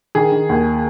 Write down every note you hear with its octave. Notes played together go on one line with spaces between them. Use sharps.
D#3 G#4
D#3
D#2